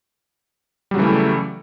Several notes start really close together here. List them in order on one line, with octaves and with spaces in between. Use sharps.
G3 F#3 C#3 E3 A3